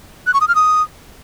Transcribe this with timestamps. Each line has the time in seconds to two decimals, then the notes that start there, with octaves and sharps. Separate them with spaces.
0.27 F#6
0.34 C#6
0.41 D#6
0.48 F6
0.55 D#6